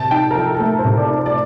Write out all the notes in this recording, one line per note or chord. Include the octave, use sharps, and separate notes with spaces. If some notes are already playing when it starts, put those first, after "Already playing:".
Already playing: C3 A5
D#4 G5
A#4
F3 A4
A4
A3 A#4
C5
C3
D5
D#4
C5
D5